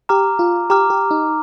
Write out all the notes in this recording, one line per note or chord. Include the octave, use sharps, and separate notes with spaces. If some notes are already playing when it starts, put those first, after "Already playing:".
G4 A#5 D6 F6
F4
G4 A#5 D6 F6
G4
D#4